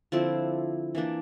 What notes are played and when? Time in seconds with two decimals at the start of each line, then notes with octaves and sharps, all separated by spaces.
0.12 D3 F3 C4 E4
0.95 E3 A#3 D4